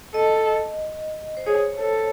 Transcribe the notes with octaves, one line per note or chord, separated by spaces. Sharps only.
A4 D#5
C5
G#4 C#5
A4